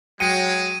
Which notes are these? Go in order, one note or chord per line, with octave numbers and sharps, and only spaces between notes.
F#3 G#3 G5 C#7 D#7